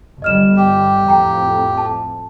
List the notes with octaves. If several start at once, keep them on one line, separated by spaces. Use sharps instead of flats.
G1 G3 D#5 F6 E7
G4
F2 A2 G5 A#5
A5